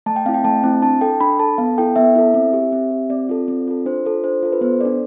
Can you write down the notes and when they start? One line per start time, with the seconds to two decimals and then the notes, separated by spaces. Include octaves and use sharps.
0.06 A3 A5
0.16 G5
0.26 C4 E4 F5
0.34 G5
0.44 A3 A5
0.63 C4 E4
0.82 D4 A5
1.01 A4 G5
1.20 D4 B5
1.39 A4 A5
1.58 B3 F5
1.78 E4 A4 G5
1.96 B3 E5
2.16 E4 A4
2.34 C4
2.53 G4
2.72 C4
2.91 G4
3.10 C4 D5
3.29 F4 A4
3.48 C4
3.68 F4 A4
3.86 D4 C5
4.05 F4 A4
4.24 D4 C5
4.42 F4 A4
4.53 B4
4.61 B3 C5
4.81 D4 A4 D5